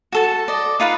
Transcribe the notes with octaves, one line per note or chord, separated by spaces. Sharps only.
F#4 A4 A5
D5 D#5
D#4 F4 B4 F5